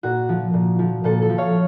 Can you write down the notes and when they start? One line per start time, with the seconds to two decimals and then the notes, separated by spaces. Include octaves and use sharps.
0.03 A#2 F#4
0.29 F3
0.54 A#2
0.79 F3
1.04 A#2 A4
1.22 A4
1.29 F3
1.38 C#5 F5